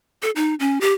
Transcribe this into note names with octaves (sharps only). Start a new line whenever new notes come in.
A4
D#4
C#4
G4